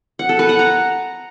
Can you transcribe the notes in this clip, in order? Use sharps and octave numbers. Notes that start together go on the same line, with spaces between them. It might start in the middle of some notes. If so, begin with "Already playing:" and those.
F#5
A4
B4
F#5
A#5